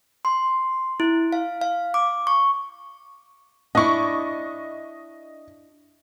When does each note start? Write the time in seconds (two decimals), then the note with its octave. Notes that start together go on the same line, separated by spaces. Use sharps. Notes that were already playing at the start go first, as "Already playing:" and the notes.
0.25 C6
1.00 E4
1.33 F5
1.61 F5
1.94 D6
2.27 C#6
3.75 D4 E4 D#5 C#6